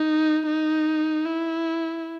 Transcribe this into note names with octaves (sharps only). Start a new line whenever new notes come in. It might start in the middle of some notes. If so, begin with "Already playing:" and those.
Already playing: D#4
D#4
E4